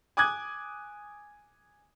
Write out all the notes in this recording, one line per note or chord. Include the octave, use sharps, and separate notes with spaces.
G#5 D6 D#6 F#6 G#6